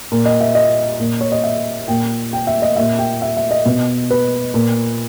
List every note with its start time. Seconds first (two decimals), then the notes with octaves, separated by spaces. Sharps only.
0.12 A#2
0.26 D#5
0.41 E5
0.55 D#5
0.99 A#2
1.21 C#5
1.32 D#5
1.43 E5
1.88 A#2 G5
2.33 G5
2.47 E5
2.62 D#5
2.76 A#2 E5
2.99 G5
3.22 E5
3.37 E5
3.51 D#5
3.66 B2
4.11 B4
4.54 A#2